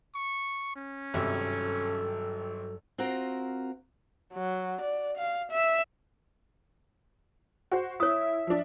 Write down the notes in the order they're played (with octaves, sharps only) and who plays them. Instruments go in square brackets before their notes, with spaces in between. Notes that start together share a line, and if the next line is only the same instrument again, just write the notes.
[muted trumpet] C#6
C#4
[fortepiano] G#1 C3 E5 [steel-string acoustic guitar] G2 F#3 [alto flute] A4
[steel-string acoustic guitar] C4 F4 F#4 A#4
[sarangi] F#3
D5
F5
E5
[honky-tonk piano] F#4 C5
[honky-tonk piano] E4 [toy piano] C#5 D#6 [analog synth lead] E5
[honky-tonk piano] F3 D4